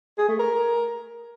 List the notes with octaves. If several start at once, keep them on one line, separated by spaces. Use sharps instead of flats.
G#4
A3
A#4